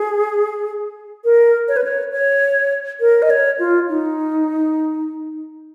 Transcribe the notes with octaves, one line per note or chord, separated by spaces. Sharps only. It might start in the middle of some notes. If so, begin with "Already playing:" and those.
Already playing: G#4
A#4
C#5
B4
C#5
C#5
A#4
D#5
C#5
F4
D#4